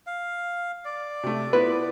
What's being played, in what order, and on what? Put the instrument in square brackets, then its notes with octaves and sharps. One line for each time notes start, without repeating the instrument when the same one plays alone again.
[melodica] F5
D5
[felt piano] C3 A3
[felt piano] B3 E4 F4 [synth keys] B4